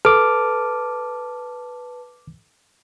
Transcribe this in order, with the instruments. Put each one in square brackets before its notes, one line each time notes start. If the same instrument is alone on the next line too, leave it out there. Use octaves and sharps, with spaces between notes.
[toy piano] A4 [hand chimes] B4 A5 [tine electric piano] D6 F6